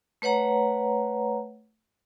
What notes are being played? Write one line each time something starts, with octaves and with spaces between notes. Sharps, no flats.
A3 B4 C#5 F#5 A#5